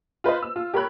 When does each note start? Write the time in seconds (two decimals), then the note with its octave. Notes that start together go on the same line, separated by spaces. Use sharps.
0.24 F4 B4 C5 D#5
0.42 E6
0.56 F4
0.74 G4 A#4 C#5 B5 F#6